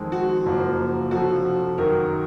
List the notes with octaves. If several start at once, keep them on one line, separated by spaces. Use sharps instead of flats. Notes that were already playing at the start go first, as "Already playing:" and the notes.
Already playing: F2 D#3 G#3
F#4
F#1 F#2 F3 A#3 F4
F1 F2 F3 F#4
F#2 D#3 F#3 A#4